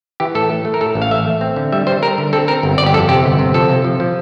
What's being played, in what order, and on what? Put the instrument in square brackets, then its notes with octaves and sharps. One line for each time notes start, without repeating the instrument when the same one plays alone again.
[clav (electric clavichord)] E3 G4
A2 A4
A3
A3
A#4
A2 A4
A1
F5
A3 E5
A3
C4
D3
G3 E5
G3 C5
G3 A#4
D3
C4 A4
C4 A#4
G1
G1 D5
G4
F2 A4
C3 G4
G1
C3
F3 A4
C3
F3
F3